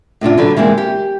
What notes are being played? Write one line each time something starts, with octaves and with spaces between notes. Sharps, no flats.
A2 C3 D4 F4
D3 F#3 B4
E3 G#3 A#3 C4
G4